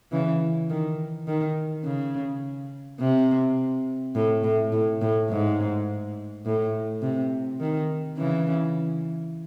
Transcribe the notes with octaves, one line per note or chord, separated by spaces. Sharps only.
C#3 E3
D#3
D#3
C#3
C3
A2
A2
A2
A2
G#2
A2
C3
D#3
C#3 E3